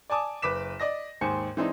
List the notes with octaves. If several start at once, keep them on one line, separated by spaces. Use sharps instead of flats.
D5 G#5 A5 D6 D#6
F#1 B4 D6 B6 E7
D5 D#5 A#6
D#2 G#2 C5 G#5 C#7
E3 G#3 C4 D4 D#4